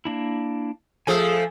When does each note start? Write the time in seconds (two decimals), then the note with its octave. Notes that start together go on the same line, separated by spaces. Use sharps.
0.05 A#3 D4 E4
1.07 F3 A3 G#4 G#5 D6 E6